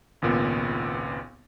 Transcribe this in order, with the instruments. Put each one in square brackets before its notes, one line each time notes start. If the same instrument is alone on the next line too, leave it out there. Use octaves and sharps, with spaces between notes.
[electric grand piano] G#1 C#2 A#2 B3